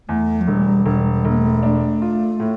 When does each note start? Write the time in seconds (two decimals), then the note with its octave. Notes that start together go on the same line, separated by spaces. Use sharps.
0.08 E2 A3
0.41 F3
0.47 E1 G3
0.86 E1 G3
1.11 G3
1.25 E1 A#3
1.38 A3
1.63 A3 D4
2.02 F4
2.40 A2